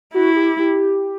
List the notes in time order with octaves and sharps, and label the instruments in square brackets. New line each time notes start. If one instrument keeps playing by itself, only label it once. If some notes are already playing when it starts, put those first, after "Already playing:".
[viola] E4 [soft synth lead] F#4
[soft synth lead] G4
G4